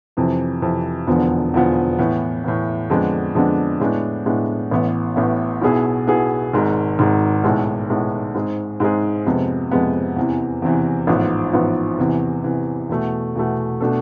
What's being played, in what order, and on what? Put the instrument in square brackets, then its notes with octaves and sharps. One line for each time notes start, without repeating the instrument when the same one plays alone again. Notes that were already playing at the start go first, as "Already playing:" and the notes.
[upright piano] F2 C3 E3
F2 C3 E3
E1 E2 D3 F3 B3
E1 E2 D3 F3 B3
A2 E3 B3
A2 E3 B3
F2 D3 G#3 B3 D4
F2 D3 G#3 B3 D4
A2 G#3 B3 D4
A2 G#3 B3 D4
A1 A2 E3 B3
A1 A2 E3 B3
B1 B2 B3 E4 G#4
B1 B2 B3 E4 G#4
G#1 G#2 G#3
G#1 G#2 G#3
B1 A2 G#3 B3
B1 A2 G#3 B3
G#2 G#3 C4 G#4
G#2 G#3 C4 G#4
F2 C3 G#3 B3
F2 C3 G#3 B3
E2 C3 E3
E2 C3 E3
A1 G#2 F3 B3
A1 G#2 F3 B3
E2 C3 E3
E2 C3 E3
E2 B2 A3
E2 B2 A3
B2 A3 D4 A4